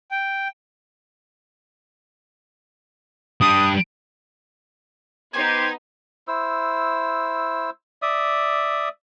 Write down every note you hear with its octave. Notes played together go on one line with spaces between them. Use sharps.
G5
G3 D4 D#6
B3 D#4 G4 C5 G#6
E4 C5 E6
D5 E5 D#6